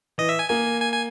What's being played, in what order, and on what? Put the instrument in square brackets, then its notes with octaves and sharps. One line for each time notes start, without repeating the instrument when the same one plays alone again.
[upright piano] E3 [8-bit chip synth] D#5
[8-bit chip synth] E5
G#5
[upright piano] A#3 [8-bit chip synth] G#5
[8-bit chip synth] G#5
G#5